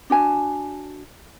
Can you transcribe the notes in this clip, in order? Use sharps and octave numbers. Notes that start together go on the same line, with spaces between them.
D4 F#4 G#5 A5